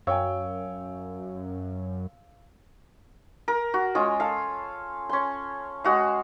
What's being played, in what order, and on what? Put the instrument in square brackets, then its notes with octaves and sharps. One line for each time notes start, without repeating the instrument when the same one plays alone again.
[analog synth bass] F#2 [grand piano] C#5 G5 G#5 [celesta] F5 E6
[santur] A#4
F#4
G#3 C#4 F4
A4 F5
C#4 C6
G#3 F#4 F5